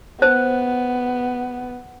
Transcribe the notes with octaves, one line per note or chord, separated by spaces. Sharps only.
B3 C5